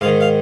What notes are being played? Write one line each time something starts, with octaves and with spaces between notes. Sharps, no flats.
G#2 D#3 F5
F5